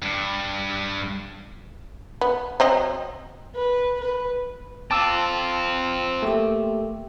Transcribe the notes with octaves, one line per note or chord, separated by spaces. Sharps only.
G2
B3
F#3 C4 D#5
B4
B4
C4 F4 A5 D6 E6
A3 A#3 G4